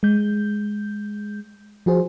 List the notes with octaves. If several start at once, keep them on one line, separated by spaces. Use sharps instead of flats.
G#3 G6
F3 F#4 G#4 C5